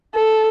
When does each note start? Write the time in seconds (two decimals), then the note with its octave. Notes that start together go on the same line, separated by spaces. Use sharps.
0.15 A4